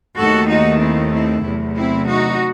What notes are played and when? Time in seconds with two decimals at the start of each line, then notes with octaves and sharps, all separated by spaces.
0.17 D#2 D#3 A3 F#4 A4
0.48 D#4 F#4
0.80 C4 E4
1.12 C4 E4
1.43 E2 C3 F#3 A3
1.75 C4 E4
2.06 D#4 F#4